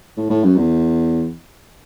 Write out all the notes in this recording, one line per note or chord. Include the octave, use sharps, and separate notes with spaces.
A2
A2
F#2
E2